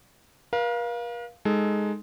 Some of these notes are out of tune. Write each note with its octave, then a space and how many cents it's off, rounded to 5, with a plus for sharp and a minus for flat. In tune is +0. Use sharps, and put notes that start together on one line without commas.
A#4 +45 F5 +0
G#3 +0 D#4 +0 A4 +0